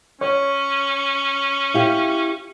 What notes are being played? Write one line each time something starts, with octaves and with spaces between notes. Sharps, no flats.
C#4 C#5
E4 G4 F5